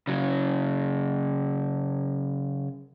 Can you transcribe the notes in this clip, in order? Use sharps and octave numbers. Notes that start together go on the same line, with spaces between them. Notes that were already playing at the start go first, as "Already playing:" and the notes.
C#3 F#3